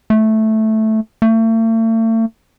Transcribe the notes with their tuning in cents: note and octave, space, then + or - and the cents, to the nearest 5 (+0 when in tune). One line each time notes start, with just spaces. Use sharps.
A3 -5
A3 +40